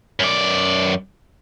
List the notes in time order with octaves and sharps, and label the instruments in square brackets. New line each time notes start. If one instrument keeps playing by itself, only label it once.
[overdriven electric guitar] F#2 D5